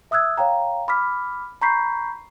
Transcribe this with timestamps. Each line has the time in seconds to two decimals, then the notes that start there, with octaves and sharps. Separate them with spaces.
0.11 E5 D#6 E6 F#6 G#6
0.37 C#5 F5 G5 A#5
0.88 B5 D6 F6 B6
1.62 A#5 B5 C#6 G6 B6 C7